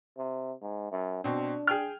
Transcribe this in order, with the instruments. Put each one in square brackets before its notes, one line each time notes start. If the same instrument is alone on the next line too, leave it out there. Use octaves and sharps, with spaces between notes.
[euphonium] C3
G#2
F#2
[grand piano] B2 C4 [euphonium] D4
[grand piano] G#4 G5 F6